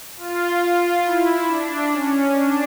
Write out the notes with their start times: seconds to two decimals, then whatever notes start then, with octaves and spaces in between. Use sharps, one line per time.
0.17 F4
1.04 E4
1.47 D4
1.90 C#4
2.34 D4